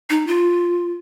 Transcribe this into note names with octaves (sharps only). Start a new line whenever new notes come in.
D#4
F4